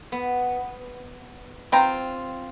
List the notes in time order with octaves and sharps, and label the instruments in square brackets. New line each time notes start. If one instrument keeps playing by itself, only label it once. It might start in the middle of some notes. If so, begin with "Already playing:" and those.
[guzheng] B3
[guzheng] C4 F4 [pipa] B4 G5 A#5